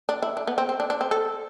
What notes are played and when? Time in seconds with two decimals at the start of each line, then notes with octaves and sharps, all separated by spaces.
0.09 D4
0.22 E4
0.37 D4
0.47 B3
0.58 C4
0.69 C4
0.80 D4
0.90 D4
1.01 C4
1.11 A4